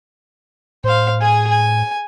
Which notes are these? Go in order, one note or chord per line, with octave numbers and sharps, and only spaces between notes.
A2 C5 F5
G#4 G#5
G#5